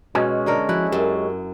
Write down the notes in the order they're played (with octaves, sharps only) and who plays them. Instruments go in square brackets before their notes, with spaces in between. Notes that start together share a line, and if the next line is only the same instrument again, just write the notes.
[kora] B2 [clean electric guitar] G#3 C#4
[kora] D3 A4 A#4
[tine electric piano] F3 F#4 F#6 [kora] E4
[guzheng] F#2 [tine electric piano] G4